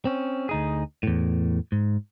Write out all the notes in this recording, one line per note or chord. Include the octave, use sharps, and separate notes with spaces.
C4 C#4
D2 D#4 G#4
E2 A2
G#2